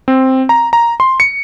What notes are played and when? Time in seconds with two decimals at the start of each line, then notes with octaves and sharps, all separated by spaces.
0.08 C4
0.49 A#5
0.73 A#5
1.00 C6
1.20 C#7